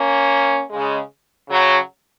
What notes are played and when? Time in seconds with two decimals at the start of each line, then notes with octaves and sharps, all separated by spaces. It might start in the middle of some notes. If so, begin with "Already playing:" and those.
Already playing: A#3 C#4
0.70 C#3 G#3
1.49 C#3 F#3